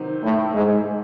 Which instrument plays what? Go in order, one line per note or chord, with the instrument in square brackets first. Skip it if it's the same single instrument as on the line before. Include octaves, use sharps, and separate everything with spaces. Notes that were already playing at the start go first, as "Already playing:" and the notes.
Already playing: [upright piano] C3 D#3 F#3 C4 D#4
[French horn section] A2
G#2